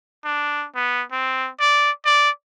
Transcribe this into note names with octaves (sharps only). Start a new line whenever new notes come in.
D4
B3
C4
D5
D5